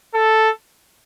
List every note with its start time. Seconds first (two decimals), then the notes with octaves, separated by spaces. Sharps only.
0.14 A4